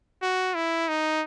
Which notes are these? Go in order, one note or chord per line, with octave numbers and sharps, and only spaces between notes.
F#4
E4
D#4